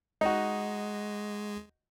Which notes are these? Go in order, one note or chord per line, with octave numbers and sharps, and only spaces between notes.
G#3 D#4 F#4